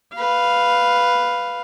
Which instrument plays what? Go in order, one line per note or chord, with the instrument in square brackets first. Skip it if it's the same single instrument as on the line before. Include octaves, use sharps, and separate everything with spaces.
[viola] B4 F5